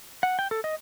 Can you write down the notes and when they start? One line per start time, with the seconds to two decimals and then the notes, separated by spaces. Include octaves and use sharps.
0.23 F#5
0.39 G5
0.51 A4
0.64 D#5